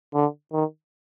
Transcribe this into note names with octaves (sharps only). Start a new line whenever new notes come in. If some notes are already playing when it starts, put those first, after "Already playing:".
D3
D#3